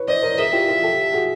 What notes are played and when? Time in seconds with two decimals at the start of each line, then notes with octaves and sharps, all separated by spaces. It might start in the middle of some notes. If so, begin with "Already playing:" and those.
Already playing: B4 C#5
0.08 C5 D5 D#5
0.23 A#4 C5
0.38 G#4 A#4 E5
0.53 F4 G4
0.68 F4 G4
0.83 G4 A4
1.13 F#4 G#4